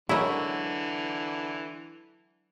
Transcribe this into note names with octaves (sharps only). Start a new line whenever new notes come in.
D3 E3 F#3 G#3 C#4 E4 A#4